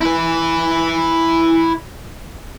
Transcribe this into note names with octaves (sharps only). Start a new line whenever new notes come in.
E4 B4